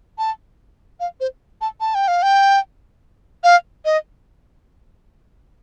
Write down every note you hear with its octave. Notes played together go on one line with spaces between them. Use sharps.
A5
F5
C5
A5
A5
G5
F5
G5
F5
D#5